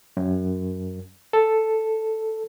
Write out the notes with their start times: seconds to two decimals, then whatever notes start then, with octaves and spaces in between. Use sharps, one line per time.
0.17 F#2
1.33 A4